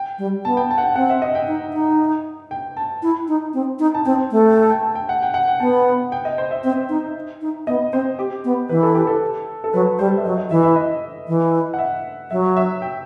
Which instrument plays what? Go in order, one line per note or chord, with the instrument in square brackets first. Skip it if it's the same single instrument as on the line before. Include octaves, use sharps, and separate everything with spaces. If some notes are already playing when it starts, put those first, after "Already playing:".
Already playing: [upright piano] G5
[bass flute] G3
[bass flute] B3 [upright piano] A5
[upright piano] G5
A5
F#5
G5
[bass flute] C4 [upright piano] F#5
[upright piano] E5
D#5
G5
[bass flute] D#4
D#4
[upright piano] G5
A5
[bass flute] E4
D#4
C4
D#4
[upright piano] A5
[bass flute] C4 [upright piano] G5
[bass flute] A3
[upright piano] G5
A5
G5
A5
G5
F#5
G5
F#5
G5
[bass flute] B3 [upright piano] A5
[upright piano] G5
D#5
C5
E5
[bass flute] C4
D#4
D#4
[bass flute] B3 [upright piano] D#5
[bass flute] C4 [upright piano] C5
[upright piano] G4
[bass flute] B3
[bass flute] E3 [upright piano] B4
[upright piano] A4
G4
A4
A4
[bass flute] F#3 [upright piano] B4
[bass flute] G3 [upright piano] C5
[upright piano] E5
[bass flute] F#3 [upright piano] D#5
[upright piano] D#5
[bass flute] E3 [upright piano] E5
[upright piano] E5
D#5
[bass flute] E3
[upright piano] F#5
E5
[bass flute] F#3 [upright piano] E5
[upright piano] E5
G5